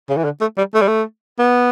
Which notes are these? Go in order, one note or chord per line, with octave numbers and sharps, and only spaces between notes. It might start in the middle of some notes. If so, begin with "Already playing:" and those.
C#3
E3
D3
A3
G3
A3
G3
A3
B3